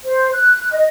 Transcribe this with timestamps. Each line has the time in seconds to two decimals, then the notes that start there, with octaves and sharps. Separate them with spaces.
0.05 C5
0.33 F#6
0.72 D#5